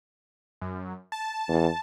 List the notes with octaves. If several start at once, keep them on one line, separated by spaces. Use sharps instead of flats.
F#2
A5
E2